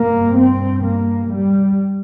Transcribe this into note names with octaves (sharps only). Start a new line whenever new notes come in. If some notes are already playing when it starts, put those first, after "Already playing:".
Already playing: G2 A#3
C4
A#3
G3